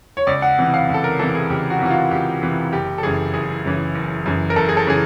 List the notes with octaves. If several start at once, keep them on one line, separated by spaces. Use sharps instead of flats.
C#5
C#2 D5
F#5
C3 E3
F5
C#2
A4
A#4
C3 E3 A4
G#4
C#2 G4
F#4
C3 E3 F#4
F4
C#2 G4
C3 E3
F#1 G4
A4
F#2 C#3 E3 G#4
F#1 G#4
F#2 C#3 E3
F#1
F#2 C#3 E3
A#4
F#1 A4
G#4
A4
C#3 E3 G#4